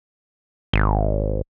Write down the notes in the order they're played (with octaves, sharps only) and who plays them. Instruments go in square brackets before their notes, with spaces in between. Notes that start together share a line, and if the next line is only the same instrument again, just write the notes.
[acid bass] G#1